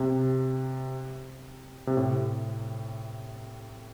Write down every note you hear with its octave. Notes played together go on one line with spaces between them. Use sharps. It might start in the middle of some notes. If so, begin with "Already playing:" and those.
Already playing: C3
C3
A2